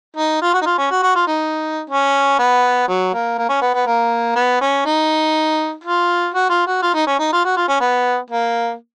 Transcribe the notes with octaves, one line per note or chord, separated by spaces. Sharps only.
D#4
F4
F#4
D#4
F4
C#4
F#4
F#4
F4
D#4
C#4
B3
F#3
A#3
A#3
C#4
B3
B3
A#3
B3
C#4
D#4
F4
F#4
F4
F#4
F4
D#4
C#4
D#4
F4
F#4
F4
C#4
B3
A#3